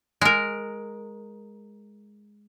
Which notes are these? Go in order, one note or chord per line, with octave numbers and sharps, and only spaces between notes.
G#3 A#4